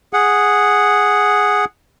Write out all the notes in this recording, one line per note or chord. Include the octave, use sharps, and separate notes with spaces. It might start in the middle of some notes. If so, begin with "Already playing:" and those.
G#4 F#5